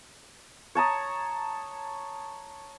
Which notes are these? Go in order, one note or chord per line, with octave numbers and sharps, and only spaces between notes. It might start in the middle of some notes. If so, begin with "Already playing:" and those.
C#5 A5 A#5 D#6